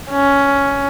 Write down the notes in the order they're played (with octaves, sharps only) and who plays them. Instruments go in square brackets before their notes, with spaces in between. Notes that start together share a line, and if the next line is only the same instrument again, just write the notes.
[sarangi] C#4